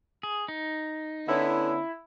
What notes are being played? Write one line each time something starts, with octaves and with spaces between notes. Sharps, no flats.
G#4
D#4
D3 B3 C#4 E4